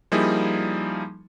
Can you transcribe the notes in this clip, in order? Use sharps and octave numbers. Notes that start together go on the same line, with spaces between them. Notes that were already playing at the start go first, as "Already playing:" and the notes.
F3 G3 A#3 D#4 E4 G#4